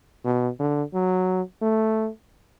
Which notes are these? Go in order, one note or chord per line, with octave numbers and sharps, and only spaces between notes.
B2
D3
F#3
A3